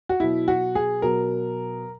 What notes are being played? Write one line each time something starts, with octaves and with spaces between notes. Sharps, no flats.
F#4
B2 F#3 E4
F#4
G#4
B2 F#3 A#4